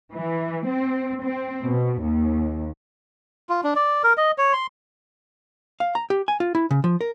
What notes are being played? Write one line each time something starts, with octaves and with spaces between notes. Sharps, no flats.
E3
C4
C4
B2
D#2
F4
D4
D5
A#4
D#5
C#5
C6
F5
A#5
G4
G#5
F4
E4
C#3
F3
A#4